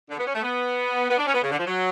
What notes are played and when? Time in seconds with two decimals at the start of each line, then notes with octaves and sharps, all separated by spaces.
0.10 D3
0.18 B3
0.27 C#4
0.34 A3
0.43 B3
1.10 B3
1.18 D4
1.26 C#4
1.34 B3
1.42 C#3
1.51 D3
1.59 F3
1.67 F#3